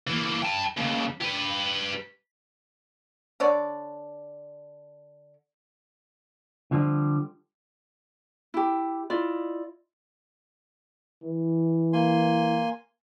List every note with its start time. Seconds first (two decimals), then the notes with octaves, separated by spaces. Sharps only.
0.07 E3 A#3
0.42 G5 A5
0.77 D#2 C#3
1.20 G4 B4
3.40 D3 C#5 D5
6.71 D3 F3 G3 C4
8.54 E4 G4
9.10 E4 F4 D5 D#5
11.23 E3
11.93 A#3 G#5 C6